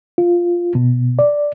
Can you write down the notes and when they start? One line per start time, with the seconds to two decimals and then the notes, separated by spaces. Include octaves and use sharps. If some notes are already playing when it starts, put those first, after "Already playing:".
0.18 F4
0.75 B2
1.19 D5